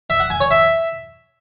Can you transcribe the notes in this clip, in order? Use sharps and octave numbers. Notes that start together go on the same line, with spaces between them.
E5
F#5
G#5
C#5
E5